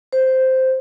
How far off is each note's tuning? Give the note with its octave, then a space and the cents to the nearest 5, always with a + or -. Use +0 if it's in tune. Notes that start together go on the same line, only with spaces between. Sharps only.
C5 -5